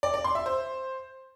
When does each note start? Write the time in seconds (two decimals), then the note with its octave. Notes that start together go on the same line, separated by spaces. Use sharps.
0.03 D5
0.14 D5
0.24 C6
0.35 E5
0.46 C5